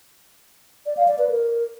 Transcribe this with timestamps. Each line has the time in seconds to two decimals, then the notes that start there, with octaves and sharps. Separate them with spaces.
0.86 D5
0.97 F5
1.08 D5
1.19 B4
1.29 A#4